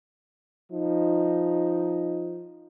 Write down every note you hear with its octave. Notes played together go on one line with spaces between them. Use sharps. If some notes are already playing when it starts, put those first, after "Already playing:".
F3 D#4